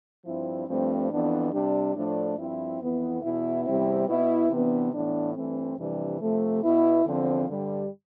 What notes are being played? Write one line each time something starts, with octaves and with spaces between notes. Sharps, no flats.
G2 F3 C4 E4
G2 F3 A3 C4
F2 E3 B3 D4
C3 G3 D4
A2 F3 A3 D4
G2 F3 C4 E4
F2 E3 B3 E4
E2 B2 B3 E4
E2 C3 G3 C4 E4
B2 B3 E4
C3 E3 B3 D4
A2 E3 B3 D4
G2 E3 A3 C4
F2 C3 E3 G3 D4
C3 F3 A3
B2 B3 E4
E2 D3 F3 C4
G2 D3 G3